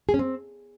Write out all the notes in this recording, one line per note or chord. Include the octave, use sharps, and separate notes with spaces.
G#4
C#4
C4